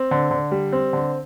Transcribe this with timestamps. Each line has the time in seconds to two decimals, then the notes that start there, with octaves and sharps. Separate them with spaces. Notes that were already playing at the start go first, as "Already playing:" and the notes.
Already playing: C4
0.11 D3
0.31 D3
0.51 G3
0.73 C4
0.93 D3